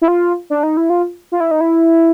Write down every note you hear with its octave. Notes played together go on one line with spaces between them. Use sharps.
E4
F4
D4
D#4
E4
F4
F4
E4
D#4
E4